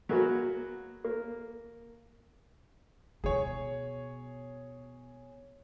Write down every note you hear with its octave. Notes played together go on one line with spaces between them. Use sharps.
F#3 G#3 A#3 B3 F#4
A#3
B2 G#4 C#5